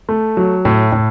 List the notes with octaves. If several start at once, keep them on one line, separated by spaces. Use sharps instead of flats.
A3
F#3
A2
A2